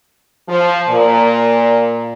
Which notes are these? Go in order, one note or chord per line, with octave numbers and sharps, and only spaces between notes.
F3
A#2